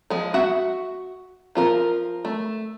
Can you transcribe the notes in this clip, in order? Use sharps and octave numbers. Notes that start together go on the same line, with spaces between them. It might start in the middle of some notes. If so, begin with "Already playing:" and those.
F3 G#3
F#4 E5 F#5
F3 F4 A#4
A3